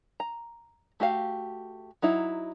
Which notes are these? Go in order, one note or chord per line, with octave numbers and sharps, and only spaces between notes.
A#5
A3 F#4 G4 F5
F#3 D#4 E4